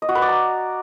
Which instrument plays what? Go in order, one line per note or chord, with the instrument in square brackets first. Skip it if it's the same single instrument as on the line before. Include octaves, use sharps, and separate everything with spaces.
[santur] D#5
F#4
B4
D5
A#5